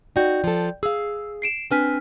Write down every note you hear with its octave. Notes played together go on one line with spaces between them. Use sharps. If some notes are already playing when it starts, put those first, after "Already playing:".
D#4 F#4 D5 G5 G6
F3 A4
G#4 F5 E6
C7 D7 E7
C4 D4 B4 G#5 F6 B6